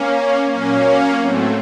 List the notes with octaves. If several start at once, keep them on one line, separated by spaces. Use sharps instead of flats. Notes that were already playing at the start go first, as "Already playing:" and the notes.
Already playing: A#3 C#4
A#2 F#3 A#3 C#4
A2 F#3 A3 C4